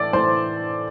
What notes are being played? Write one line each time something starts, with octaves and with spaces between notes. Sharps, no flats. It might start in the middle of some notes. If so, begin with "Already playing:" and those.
Already playing: A2 E3 A4 D5 D6
A2 E3 C5 C6